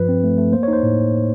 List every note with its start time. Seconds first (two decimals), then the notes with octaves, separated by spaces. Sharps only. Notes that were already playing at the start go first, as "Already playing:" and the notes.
Already playing: G2 F3 B4
0.09 C4
0.24 A3
0.38 A3
0.52 A#3 C5
0.63 D#4 C#5
0.73 C5
0.83 A2